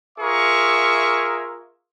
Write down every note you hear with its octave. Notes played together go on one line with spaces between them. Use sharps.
F4 G#4 A#4 E5 C#6